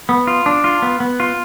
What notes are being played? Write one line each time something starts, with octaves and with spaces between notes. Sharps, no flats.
B3
F4
D4
F4
B3
B3
F4